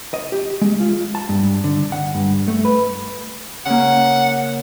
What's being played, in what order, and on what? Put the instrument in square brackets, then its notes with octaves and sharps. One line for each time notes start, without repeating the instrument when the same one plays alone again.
[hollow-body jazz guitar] D#5
G4
G#3
F4
A5
G2
D3
F#5
G2
A3
B4
[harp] C#3 A#3 [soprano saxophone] F#5